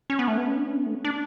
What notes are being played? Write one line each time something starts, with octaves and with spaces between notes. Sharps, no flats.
C#4
B3
A3
B3
C#4
D4
C#4
B3
A3
C#4
D4